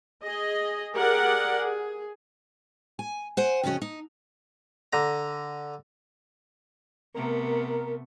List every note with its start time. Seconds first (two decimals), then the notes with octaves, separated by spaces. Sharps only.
0.22 G#4 D#5
0.95 G4 G#4 A#4 D5 F#5
1.61 G#4
2.99 G#5
3.37 C5 F#5 G#5
3.63 F2 C#3 C#4 F#4 D#5
3.82 D#4
4.93 D3 A#5
7.14 C3 A3 B3 A#4